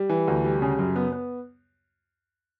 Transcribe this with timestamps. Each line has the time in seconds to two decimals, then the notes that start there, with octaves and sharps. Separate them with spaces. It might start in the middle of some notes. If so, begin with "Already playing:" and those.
Already playing: G3
0.09 E3
0.27 D2
0.44 G3
0.62 C#3
0.79 F#2
0.96 B3
1.12 B3